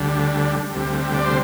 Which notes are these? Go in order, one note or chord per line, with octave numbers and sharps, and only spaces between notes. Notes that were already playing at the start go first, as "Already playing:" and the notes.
Already playing: D2 D3 G3
D2 C3 G3
D5
C5